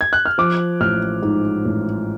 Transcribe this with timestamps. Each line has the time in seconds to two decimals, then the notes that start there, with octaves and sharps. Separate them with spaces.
0.01 G#6
0.13 F#6
0.26 F6
0.38 F3 D6
0.81 A1 F6
1.23 G#2
1.65 A1